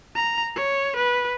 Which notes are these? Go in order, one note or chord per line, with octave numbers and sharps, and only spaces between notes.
A#5
C#5
B4